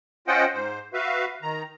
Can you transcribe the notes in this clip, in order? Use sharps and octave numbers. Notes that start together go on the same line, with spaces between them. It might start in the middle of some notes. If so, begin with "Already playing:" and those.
C#4 F4 C5 D#5 F#5 G5
G#2 C5
F#4 B4 E5 F5
D#3 A#5